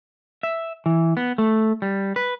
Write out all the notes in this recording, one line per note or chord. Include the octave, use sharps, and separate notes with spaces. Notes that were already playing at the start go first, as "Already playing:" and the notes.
E5
E3
B3
A3
G3
B4